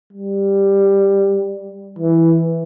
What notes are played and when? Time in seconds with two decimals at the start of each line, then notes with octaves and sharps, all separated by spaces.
0.13 G3
1.99 E3